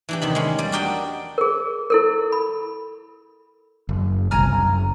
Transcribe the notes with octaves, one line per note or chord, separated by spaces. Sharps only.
E3 D4 G4
E2 C3 D#3 B5
G#3 C#4
G3 D5
D4 F#4 G4 A#4 D#5 G5
G#4 A#4
E4 A4 A#4
B5
F#1
G1 C2 G#5 A#5 F6
F#1